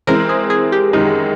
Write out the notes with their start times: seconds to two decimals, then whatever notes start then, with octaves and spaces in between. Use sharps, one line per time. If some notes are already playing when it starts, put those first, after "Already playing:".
0.07 E3 G#3 C4 A#4
0.29 G#4
0.50 G#4
0.72 G4
0.93 F#2 D#3 G#3 D#4